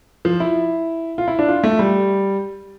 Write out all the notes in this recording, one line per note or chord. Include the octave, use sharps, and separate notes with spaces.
F3
E4
F4
E4
D4
F4
A3
G3